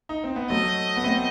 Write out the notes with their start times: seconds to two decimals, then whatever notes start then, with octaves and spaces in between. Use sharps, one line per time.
0.09 D#4
0.24 C4
0.36 B3
0.50 F#3 A3 D#5
0.96 B3
1.04 A3 C4